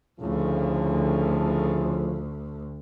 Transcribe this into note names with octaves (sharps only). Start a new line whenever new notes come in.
D2 A2 C#3 F3